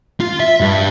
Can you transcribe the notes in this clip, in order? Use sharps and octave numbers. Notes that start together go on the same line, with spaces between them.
F4
E5
G2